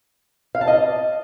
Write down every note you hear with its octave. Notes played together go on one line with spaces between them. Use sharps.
F5
A5
D#5